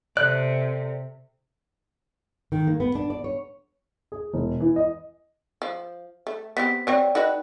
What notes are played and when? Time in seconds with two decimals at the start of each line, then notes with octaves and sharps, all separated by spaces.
0.17 C3 A4 D5 F#6
2.52 D#3
2.67 A#3
2.80 B3
2.95 D4
3.10 D5
3.24 C#5
4.12 G#4
4.34 E1
4.60 E3
4.76 D#5
5.62 F3
6.27 A3
6.57 B3 C4 G4 B6
6.87 F#3 C4 C#5 D5 G5
7.15 D#4 F#4 B4